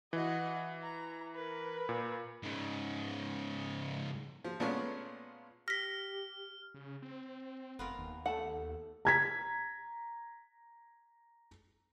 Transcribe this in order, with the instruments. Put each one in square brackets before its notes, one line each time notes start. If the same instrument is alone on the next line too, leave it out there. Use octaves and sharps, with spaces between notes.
[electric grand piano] E3 [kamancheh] F#4 D#5
[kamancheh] A#5
A#4 B4
[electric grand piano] A#2
[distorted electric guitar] G#2 C#3
[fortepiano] F3
A#2 G#3 A3 B3 C#4 F4
[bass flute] G4 [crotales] F6 [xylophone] A#6 B6
[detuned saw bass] C#3
C4
[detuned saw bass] F1 [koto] B3 F4 A#4
[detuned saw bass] D#2
[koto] A3 [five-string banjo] F#5 A5
[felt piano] A#5 G#6 B6